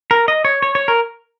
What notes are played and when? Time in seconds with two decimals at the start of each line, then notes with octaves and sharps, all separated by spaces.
0.11 A#4
0.28 D#5
0.45 C#5
0.62 C#5
0.75 C#5
0.88 A#4